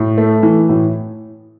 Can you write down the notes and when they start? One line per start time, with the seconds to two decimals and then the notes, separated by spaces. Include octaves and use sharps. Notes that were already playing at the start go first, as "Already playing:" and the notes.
Already playing: A2
0.18 A3
0.43 E3
0.69 A2